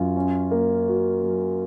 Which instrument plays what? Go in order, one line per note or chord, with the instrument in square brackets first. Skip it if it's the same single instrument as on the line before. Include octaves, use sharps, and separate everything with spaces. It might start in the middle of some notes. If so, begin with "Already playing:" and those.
Already playing: [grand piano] F#2 F4
C#4
A#3
F#4
F#3